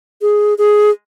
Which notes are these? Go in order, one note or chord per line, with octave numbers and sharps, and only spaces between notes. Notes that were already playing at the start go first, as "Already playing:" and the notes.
G#4
G#4